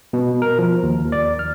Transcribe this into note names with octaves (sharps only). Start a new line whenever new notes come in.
B2
A#4
F3
D#2
D5
F6